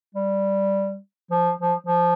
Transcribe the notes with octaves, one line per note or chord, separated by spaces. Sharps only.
G3
F3
F3
F3